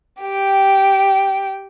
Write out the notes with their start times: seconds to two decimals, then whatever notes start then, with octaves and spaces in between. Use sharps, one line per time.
0.22 G4 G5